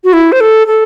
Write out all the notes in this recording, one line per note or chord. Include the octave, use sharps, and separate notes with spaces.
F#4
E4
C5
A4
A4